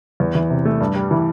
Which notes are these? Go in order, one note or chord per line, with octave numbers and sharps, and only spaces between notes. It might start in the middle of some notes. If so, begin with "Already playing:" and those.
E2
E3
C3
A3
G2
G3
E3